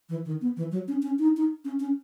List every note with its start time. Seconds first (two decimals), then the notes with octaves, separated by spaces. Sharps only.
0.09 E3
0.25 D#3
0.41 B3
0.57 E3
0.72 F#3
0.88 C#4
1.02 C#4
1.19 D#4
1.37 D#4
1.65 C#4
1.80 C#4